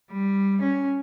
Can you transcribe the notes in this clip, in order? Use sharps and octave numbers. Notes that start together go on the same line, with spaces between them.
G3
C#4